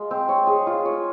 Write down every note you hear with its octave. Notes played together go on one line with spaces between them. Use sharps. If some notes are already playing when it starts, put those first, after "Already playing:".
Already playing: G#3 F4
C4
C#5
G#4
F4
C#5